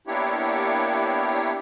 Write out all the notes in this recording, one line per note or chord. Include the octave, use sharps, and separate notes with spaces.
A#3 B3 D4 E4 G4 C#5